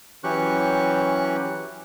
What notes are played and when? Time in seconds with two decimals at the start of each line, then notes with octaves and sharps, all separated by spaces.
0.24 E3 F#3 C#4 G4 C#6 F#6